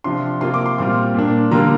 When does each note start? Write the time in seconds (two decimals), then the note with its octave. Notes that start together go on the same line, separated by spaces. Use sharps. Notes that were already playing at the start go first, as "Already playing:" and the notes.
0.04 C3 F3 D4 F4 C6
0.41 C3 A#3 F4 C6
0.54 D6
0.66 C6
0.78 A#2 G3 C4 F4 D6
1.14 A#2 A#3 D4
1.51 D3 G3 A#3 F4 A#5